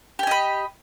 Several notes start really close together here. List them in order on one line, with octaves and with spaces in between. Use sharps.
G4 G#5 D#5 B5